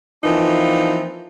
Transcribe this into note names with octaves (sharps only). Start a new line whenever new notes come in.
E3 F3 A#3 C4 D4 D#4